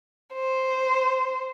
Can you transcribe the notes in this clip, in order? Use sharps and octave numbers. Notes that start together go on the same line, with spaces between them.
C5